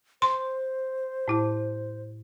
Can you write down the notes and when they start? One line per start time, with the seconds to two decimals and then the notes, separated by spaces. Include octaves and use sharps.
0.22 C5 C6
1.28 A2 E4 A5